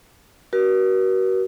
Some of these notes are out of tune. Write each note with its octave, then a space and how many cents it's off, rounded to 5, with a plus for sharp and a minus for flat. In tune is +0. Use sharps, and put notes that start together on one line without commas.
F#4 +35 A#4 +45